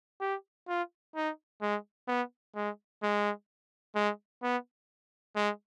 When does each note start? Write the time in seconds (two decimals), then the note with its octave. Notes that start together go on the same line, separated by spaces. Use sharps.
0.21 G4
0.68 F4
1.16 D#4
1.62 G#3
2.08 B3
2.56 G#3
3.03 G#3
3.95 G#3
4.43 B3
5.36 G#3